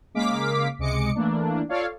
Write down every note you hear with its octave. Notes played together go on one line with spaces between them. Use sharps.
C#3 G#3 A#3 F5 D6 B6
C#2 C3 G#3 D#5 D6 C#7
E3 A3 A#3 D4
F4 A4 C#5 D5 F5